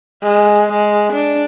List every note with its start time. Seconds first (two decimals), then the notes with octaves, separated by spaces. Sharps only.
0.23 G#3
0.72 G#3
1.13 D4